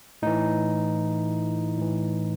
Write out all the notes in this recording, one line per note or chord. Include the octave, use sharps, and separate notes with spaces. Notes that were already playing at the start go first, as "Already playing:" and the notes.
A2 E3 D#4
A2 E3